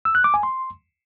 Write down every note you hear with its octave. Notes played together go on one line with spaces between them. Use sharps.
E6
F#6
D6
G#5
C6